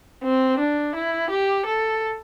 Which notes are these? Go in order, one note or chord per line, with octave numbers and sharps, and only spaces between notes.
C4
D4
E4
G4
A4